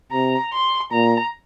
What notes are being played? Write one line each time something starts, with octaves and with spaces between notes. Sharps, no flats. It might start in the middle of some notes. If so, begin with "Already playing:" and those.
C3 A#5
C6
A#2 A#5